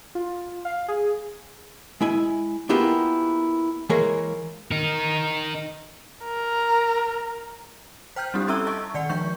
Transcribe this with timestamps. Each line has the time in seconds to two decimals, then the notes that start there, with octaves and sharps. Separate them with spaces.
0.15 F4
0.65 F5
0.88 G#4
2.01 G#3 E4 G#5
2.69 A#3 B3 E4 F4 G4 G#4
3.89 E3 G#3 A#3 G#4 A#4 C#5
4.71 D#4 A#4
6.25 A#4
8.16 C5 G5 F6 G6
8.34 G3 C4 D4 E4 G4
8.48 C#4 A4 E5 A#5 E6 G7
8.67 D#5 A5 C#6
8.94 D#3 D5 F#5 C#7
9.09 F3 G#3 D4 C#6 G6